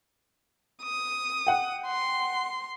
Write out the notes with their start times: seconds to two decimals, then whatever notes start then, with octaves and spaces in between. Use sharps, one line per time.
0.82 D#6
1.47 F#5 G5
1.87 C6